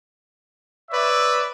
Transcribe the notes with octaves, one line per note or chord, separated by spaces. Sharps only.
B4 C#5 D5 E5